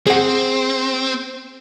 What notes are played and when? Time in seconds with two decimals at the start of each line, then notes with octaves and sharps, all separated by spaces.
0.07 C4 G#4 F#5